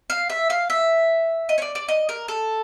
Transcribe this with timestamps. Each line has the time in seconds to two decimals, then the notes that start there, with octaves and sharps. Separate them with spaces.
0.10 F5
0.30 E5
0.50 F5
0.70 E5
1.49 D#5
1.58 C#5
1.62 D5
1.75 D5
1.88 D#5
2.09 A#4
2.28 A4